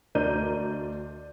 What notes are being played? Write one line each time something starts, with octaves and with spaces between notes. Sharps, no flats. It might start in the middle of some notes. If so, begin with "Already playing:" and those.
D2 D4 A#4 D#5 G6 D#7